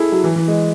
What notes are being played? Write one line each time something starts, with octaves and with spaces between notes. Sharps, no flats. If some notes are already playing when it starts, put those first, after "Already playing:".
Already playing: E4 G#4 A4
F#3
E3
E3
G#3